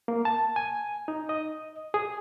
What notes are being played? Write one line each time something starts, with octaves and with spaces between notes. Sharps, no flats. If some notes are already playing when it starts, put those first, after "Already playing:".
A#3
A5
G#5
D#4
D#5
G#4